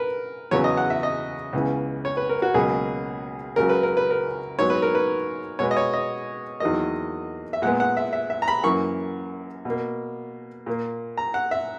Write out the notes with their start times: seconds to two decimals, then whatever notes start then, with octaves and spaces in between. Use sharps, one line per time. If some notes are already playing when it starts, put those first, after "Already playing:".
Already playing: A#4 B4
0.51 E2 C#3 F#3 B3 C#5
0.64 D#5
0.77 F#5
0.90 E5
1.03 D#5
1.53 C#2 C#3 E3 B3
2.05 C#5
2.17 B4
2.29 A#4
2.42 F#4
2.54 C#2 B2 F#3 A#3 G#4
3.56 C#2 C#3 F#3 A#4
3.69 B4
3.83 A#4
3.97 B4
4.11 A#4
4.59 G#2 F#3 B3 C#5
4.70 B4
4.82 A#4
4.95 B4
5.59 B2 G#3 B3 C#5
5.71 D#5
5.77 C#5
5.94 D#5
6.60 E2 D#3 F#3 A#3 D#5
7.53 E5
7.62 A#2 G#3 B3 F#5
7.80 F#5
7.97 E5
8.13 E5
8.30 E5
8.42 A#5
8.48 B5
8.63 F#2 E3 A#3 C#6
9.65 B2 A#3
10.66 A#2 A#3
11.17 A#5
11.34 F#5
11.51 E5